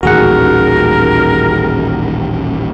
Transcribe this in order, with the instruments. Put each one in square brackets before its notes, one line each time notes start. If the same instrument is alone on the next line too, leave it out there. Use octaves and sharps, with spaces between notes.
[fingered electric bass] D#1 A1 D#2 [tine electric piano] F#4 G#4 F#5 [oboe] A#4